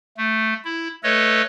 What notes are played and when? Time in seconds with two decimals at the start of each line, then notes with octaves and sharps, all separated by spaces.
0.17 A3
0.65 E4
1.03 A3 A4 B4 C#5 D#5